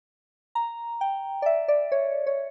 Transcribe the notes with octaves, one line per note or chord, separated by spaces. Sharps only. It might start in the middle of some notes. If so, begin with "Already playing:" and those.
A#5
G5
D5
E5
D5
C#5
C#5